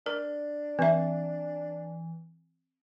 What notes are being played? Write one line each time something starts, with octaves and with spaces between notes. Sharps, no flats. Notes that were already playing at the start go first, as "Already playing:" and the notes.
D4 A#4
E3 C4 E5